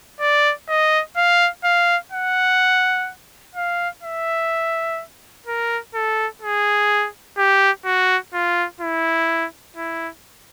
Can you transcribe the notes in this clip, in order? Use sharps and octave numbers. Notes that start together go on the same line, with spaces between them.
D5
D#5
F5
F5
F#5
F5
E5
A#4
A4
G#4
G4
F#4
F4
E4
E4